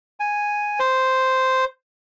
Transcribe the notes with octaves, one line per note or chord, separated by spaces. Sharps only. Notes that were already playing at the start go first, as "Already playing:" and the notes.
G#5
C5